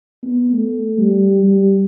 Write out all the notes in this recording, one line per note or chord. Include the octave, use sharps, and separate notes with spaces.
B3
A3
G3
G3